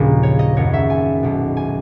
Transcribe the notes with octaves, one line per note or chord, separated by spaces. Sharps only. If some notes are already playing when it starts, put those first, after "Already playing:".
Already playing: A#1 D#2 A#2 C#3 G#4 B4
C#5
D#5
G#1 F#2 D#3 C#5
E5
G#5
B1 B2
G#5